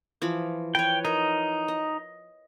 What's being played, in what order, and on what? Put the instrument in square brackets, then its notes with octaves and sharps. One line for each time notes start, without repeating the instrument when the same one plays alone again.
[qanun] E3 F3 B5
[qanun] B4 C#5 [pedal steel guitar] G5
[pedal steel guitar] D#4 [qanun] A#4
[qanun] D#5